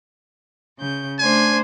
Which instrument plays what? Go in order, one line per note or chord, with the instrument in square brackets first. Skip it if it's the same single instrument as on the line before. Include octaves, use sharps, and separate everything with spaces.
[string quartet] C#3 G6
[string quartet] A3 D4 C5 [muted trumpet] G#5